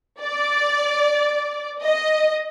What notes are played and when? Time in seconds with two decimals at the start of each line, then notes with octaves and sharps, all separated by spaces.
0.21 D5
1.82 D#5